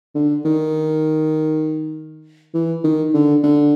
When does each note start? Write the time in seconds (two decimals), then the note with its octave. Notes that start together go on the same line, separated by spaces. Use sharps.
0.15 D3
0.45 D#3
2.54 E3
2.83 D#3
3.14 D3
3.43 D3